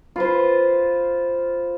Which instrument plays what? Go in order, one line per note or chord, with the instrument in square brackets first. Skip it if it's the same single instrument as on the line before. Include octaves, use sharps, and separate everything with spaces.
[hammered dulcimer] F4 B4 C5